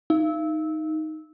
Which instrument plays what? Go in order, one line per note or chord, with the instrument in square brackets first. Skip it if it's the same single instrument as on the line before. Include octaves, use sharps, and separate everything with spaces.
[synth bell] D#4